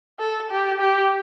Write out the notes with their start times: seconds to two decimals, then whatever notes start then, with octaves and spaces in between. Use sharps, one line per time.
0.19 A4
0.51 G4
0.80 G4